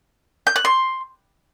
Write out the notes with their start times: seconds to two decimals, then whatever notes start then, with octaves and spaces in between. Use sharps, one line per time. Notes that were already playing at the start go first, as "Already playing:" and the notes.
0.47 G6
0.56 F#6
0.65 C6